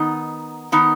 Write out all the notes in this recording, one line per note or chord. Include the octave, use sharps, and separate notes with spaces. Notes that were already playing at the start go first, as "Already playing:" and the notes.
Already playing: D#3 B3 D#4
D#3 B3 D#4